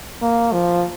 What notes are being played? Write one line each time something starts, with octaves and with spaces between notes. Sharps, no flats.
A#3
F3